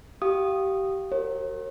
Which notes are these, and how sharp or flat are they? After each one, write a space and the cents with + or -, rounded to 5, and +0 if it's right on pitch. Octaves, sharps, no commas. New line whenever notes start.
G4 -25 F5 +0 D#6 -10
F#4 +25 A#4 -20 C#5 -45